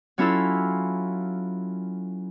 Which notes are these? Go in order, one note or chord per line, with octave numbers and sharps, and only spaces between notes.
F#3 C#4 E4 F4 A4 E6